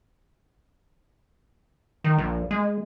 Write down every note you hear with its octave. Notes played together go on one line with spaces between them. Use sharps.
D#3
A#1
G#3